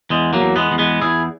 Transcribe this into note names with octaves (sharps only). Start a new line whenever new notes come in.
E2 G#3
F#3 A#3
E2
G#3 B3
E2
G#3 B3
E2 E4 G#4